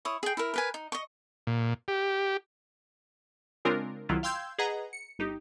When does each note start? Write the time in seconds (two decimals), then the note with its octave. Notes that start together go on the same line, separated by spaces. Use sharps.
0.05 E4 C#5 D#6
0.23 G#4 G5
0.37 E4 A#4
0.54 A#4 B4 G#5
0.74 D#4
0.92 D#5 C#6
1.47 A#2
1.88 G4
3.65 C#3 G#3 C4 D4 F4 A#4
4.09 C2 D#3 F#3 E4 F4
4.23 F5 G5 C6 E6 G6 G#6
4.58 G#4 B4 D#5 F#5 A#5
4.93 C#7
5.19 G1 D#4 G4